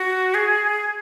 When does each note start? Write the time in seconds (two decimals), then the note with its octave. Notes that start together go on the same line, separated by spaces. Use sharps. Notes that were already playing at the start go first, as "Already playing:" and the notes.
Already playing: F#4
0.34 G#4